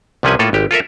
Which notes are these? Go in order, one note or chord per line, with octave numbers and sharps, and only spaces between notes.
C2 C3 F3 C#4 B4 G#5
A2 A#3 F4 A4
G#1 G4
F4 A4 A#4 E5